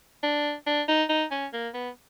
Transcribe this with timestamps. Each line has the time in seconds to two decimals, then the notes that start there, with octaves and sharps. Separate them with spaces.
0.23 D4
0.67 D4
0.88 D#4
1.09 D#4
1.31 C#4
1.53 A#3
1.74 B3